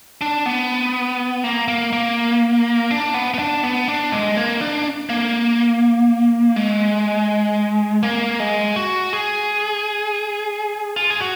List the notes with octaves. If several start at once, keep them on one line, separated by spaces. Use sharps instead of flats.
D4
B3
A#3
A#3
A#3
D4
B3
B3
D4
B3
D4
G#3
A#3
D4
A#3
G#3
A#3
G#3
F#4
G#4
F4
G#4
F#4